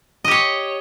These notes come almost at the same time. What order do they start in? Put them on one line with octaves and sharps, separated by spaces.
D#5 G4 C#5